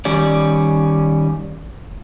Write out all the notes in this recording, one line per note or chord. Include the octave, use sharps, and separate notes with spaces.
D#3 G3 C#4 D5